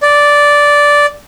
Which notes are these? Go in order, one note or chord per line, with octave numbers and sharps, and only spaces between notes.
D5